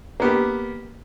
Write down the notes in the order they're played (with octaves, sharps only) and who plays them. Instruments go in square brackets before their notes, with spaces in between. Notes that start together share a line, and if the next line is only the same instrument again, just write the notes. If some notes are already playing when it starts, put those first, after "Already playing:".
[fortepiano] A#3 B3 G4